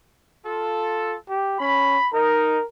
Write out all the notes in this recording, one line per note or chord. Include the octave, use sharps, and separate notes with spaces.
F4 A4
G4
C#4 B5
D#4 A#4